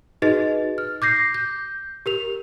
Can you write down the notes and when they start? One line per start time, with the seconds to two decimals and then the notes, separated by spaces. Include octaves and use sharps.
0.22 D#4 F#4 G#4 B4 D#5 A6
0.78 F6
1.02 D6 G6 A#6 C7
1.34 G6
2.06 G4 A#4 F7